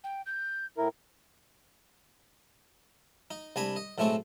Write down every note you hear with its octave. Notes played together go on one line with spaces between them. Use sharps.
G5
G6
A2 E4 A#4
D#4
C2 D4 G#5 A#5 B5
D#5
B1 A2 G#3 A3 C4 C#6